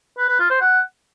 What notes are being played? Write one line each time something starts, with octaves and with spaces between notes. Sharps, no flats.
B4
B4
F4
C5
F#5